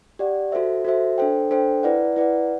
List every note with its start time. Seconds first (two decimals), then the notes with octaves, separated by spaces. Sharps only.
0.19 G4 D5 F#5
0.52 F#4 A4 C5 E5
0.85 F#4 A4 C5 E5
1.18 D4 A4 C5 G5
1.51 D4 A4 C5 G5
1.83 E4 B4 D5 F#5
2.16 E4 B4 D5 F#5